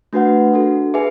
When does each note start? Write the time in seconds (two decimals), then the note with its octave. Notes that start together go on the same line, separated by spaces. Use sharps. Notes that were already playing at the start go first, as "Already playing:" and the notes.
0.13 A3 D4 F#4 B4 F#5
0.53 D4 F#4 A4
0.94 G#4 B4 E5 G#5